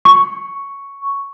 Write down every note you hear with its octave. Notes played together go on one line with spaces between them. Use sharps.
C#6